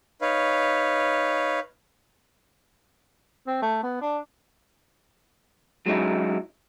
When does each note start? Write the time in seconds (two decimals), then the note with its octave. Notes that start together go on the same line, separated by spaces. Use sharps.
0.21 D#4 B4 C#5 F5
3.47 C4
3.62 A3
3.83 B3
4.01 D4
5.86 F#3 G#3 C#4 D#4 E4